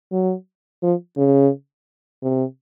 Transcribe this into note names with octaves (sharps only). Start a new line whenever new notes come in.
F#3
F3
C#3
C3